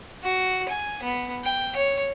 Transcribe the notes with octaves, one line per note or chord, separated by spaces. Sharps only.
F#4
G#5
B3
G5
C#5